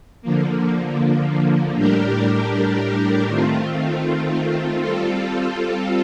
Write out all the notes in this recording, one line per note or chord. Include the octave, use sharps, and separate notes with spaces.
D3 F3 A#3
A2 G3 D4 G4 A#4
D#3 A3 C4 F4
G3 C4 F4 A4